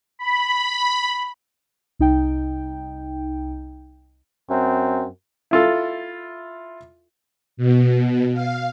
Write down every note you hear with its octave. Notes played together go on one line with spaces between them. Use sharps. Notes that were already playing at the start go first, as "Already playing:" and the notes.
B5
C2 D#4 G5
F#2 C4
E4 F4 A4
B2
F5